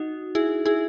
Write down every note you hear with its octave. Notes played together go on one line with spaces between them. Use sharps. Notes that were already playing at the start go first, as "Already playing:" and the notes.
Already playing: D#4 F#4
E4 G#4
E4 G#4